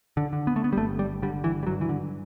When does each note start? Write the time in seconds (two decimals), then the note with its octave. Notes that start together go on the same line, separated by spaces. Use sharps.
0.17 D3
0.33 D3
0.47 B3
0.56 A3
0.64 B3
0.73 G3
0.77 G1 A3
0.99 G3
1.22 D3 G3
1.44 E3
1.63 G3
1.67 G2 F#3
1.81 E3
1.89 D3